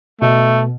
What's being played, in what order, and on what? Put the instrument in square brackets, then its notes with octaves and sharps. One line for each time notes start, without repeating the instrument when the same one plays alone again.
[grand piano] B2 [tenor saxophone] A3